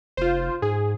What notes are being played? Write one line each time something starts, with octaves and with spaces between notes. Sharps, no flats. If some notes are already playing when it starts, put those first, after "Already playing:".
F1 F4 C5
G#2 G#4